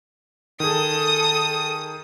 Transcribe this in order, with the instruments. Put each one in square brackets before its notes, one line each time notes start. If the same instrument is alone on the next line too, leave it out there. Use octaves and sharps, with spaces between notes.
[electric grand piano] D#3 G#4 [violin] A4 D#6